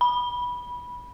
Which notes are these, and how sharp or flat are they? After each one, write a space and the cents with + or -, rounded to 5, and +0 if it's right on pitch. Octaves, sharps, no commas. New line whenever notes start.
B5 -15